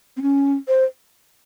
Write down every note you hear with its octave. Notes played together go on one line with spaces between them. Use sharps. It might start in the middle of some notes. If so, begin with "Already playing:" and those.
C4
C#4
C5